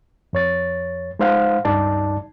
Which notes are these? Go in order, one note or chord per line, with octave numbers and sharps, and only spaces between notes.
F2 C#5 A6
G#3 D#4 C5 F5 F#5
C#2 G2 D#4 D5 A5